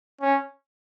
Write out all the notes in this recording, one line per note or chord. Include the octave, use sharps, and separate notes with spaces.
C#4